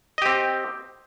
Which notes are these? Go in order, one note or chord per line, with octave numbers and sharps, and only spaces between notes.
C4 G4 D#5